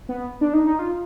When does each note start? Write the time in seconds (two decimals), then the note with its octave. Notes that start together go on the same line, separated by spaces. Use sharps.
0.09 B3
0.41 D4
0.54 D#4
0.66 D#4
0.79 F4